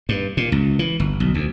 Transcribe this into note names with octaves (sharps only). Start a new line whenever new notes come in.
G2
A#2
C#2
E3
G1
B1
D2